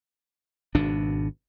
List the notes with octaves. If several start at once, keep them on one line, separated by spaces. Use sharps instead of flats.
G#1 B2 D4